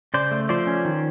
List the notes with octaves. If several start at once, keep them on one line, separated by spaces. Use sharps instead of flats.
C#3 C5 D5
A3
F3 C5 D5
C#4
D#3